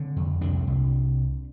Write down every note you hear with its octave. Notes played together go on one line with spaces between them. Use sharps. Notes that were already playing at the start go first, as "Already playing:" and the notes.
Already playing: D3 C4
F2
C2 D4
C2